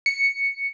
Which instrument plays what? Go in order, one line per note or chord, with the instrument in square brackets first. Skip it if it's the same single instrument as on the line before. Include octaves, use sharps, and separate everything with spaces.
[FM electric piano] C#7